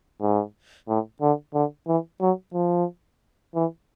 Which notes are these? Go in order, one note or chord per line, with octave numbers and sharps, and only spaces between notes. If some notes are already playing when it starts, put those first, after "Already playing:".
G#2
A2
D3
D3
E3
F#3
F3
E3